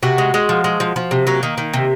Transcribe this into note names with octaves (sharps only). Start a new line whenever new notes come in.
C3 F#4
G#3
G#3
F3
G#3
F3
F3
C3
F#3 A#3
D#3
D#3
C3